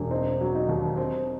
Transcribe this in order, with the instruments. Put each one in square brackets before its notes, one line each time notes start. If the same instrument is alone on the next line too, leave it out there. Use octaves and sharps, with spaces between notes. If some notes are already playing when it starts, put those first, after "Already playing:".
Already playing: [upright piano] E1
C4 D#4
F#3
D#4
D#2
C4